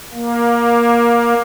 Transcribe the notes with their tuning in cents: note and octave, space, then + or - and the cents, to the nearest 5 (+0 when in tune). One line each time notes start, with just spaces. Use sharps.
A#3 +15